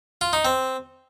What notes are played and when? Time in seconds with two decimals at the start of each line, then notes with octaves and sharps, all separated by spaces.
0.21 F4
0.33 D#4
0.45 C4